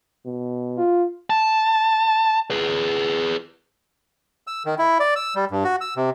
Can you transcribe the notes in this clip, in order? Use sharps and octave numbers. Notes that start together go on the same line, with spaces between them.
B2
F4
A5
G#4 B4
E6
D#3
E4
D5
E6
G3
G2
F#4
E6
C3